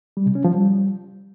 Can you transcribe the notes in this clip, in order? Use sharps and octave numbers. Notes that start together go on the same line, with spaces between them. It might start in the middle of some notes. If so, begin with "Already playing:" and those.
G3
C3
C#4
F3
G3